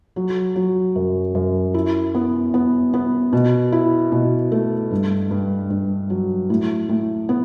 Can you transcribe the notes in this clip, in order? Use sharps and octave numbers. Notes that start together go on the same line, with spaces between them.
F#3
F#3
F#2
F#2
E4
B3
B3
B3
B2
E4
B2
A3
G2
G2
G2
F#3
A2
A2
B3